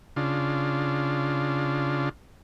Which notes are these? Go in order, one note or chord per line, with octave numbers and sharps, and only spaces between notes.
C#3 D4 F4